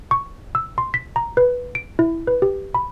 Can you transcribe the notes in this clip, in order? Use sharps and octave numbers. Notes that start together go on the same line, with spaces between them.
C#6
E6
C6
B6
A#5
B4
D7
E4
B4
G4
B5